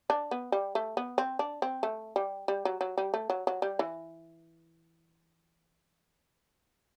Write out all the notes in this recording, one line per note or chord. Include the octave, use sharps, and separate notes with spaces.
D4
B3
G3
A3
B3
C4
D4
C4
A3
G3
G3
F#3
F#3
G3
A3
F#3
F#3
G3
E3